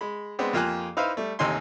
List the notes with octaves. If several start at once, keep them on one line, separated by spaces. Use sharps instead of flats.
G#3 B5
G#3 B3 C4 D4
F2 A#3 F4 G4 G#5 F#6
D#4 E4 B4 C5 E5 F5
G3 A3
A1 D#2 C3 D#4 G#5 C6